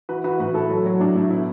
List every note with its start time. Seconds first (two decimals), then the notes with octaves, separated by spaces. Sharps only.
0.09 E3 F#4 B4
0.24 E3 F#4 B4
0.39 A2 F#4 B4
0.54 A2 E4 A4
0.71 F#3
0.86 F#3
1.00 A2 D4
1.15 A2 E4
1.31 B2 E4